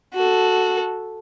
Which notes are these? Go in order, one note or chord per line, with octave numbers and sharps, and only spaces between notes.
F#4 A4